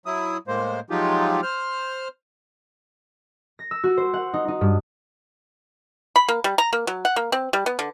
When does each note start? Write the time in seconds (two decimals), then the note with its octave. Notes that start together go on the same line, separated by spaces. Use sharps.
0.06 F#3 E4 D#6
0.48 A2 G#3 A#3 C5
0.90 F3 F#3 G#3 D#4 F4 G4
1.43 C5 F6
3.59 A#6
3.71 E6
3.84 F#4
3.97 C5
4.14 F#5
4.34 D#4
4.48 D#4
4.61 G2
6.16 B5
6.28 A#3
6.44 G3
6.58 A#5
6.73 A#3
6.87 F#3
7.05 F#5
7.16 A#3
7.32 C4
7.53 G3
7.66 B3
7.79 D3